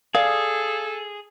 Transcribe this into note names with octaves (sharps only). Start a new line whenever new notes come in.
G#4 A4 D5 F5